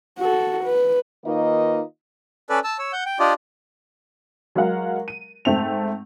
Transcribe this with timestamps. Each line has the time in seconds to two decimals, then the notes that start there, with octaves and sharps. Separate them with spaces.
0.19 F#4 A4
0.64 B4
1.26 D#3 A#3 D#4 F4 B4 D#5
2.50 C#4 A4 B4 D5
2.64 A5 E6
2.79 C#5 E6
2.93 F#5 G6
3.06 G5
3.20 D4 F4 G4 D5 D#5
4.55 F#3 G#3 A#4 F5 F#5
5.08 D#7
5.45 G#2 A3 C4 F7